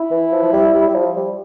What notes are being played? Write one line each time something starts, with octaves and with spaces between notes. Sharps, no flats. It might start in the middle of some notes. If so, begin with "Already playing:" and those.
Already playing: E4
E3
F3
F3
G3
G3
G3
F3
G3